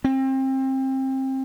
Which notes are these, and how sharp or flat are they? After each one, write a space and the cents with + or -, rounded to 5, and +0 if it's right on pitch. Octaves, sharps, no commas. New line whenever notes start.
C4 +25